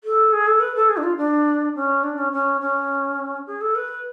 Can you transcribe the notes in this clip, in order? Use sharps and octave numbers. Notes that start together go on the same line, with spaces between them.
A4
G#4
A4
B4
A4
G#4
D4
F4
D4
C#4
D4
C#4
C#4
C#4
G#4
A4
B4